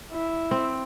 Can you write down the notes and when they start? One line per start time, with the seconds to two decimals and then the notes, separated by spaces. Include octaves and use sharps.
0.12 E4
0.51 C4